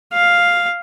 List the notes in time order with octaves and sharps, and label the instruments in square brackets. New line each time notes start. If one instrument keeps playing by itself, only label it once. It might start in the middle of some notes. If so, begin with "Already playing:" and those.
[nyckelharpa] F5